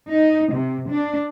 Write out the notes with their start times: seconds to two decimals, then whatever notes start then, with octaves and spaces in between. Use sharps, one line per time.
0.10 D#4
0.55 C3
0.91 D4